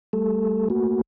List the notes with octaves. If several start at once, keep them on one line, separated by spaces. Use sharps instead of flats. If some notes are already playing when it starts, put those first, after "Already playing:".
G3 A3 A4
A3 A#3 F#4